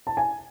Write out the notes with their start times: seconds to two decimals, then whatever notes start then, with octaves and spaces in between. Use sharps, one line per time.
0.07 A5
0.17 G#5